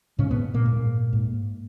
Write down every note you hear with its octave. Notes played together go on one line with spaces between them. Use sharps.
G#2 C#3 C#4
B2 B3
A#2 A#3
G#2
G#2